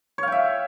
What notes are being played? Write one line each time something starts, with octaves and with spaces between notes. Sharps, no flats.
C#5 E5 F5 G5